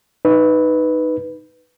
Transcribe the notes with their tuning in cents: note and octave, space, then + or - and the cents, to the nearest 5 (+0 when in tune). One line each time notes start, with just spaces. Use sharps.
D#4 +0 B4 +0